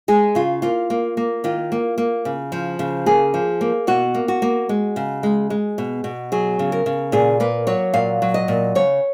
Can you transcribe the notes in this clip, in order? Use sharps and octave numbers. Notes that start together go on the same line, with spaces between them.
G#3 G#4
C#3 F4
A#3 F4
A#3
A#3
D#3 F4
A#3
A#3
C#3
F3
C#3
A#3 G#4
F3
A#3
B2 F#4
A#3
F#4
A#3
G#3
C#3
G#3
G#3
B2
B2
F#3 G#4
C#3
A#4
C#3
A#2 G#4
A#3 B4
F#3 C#5
A#2 F5
F#3
D#5
A#2
C#3 C#5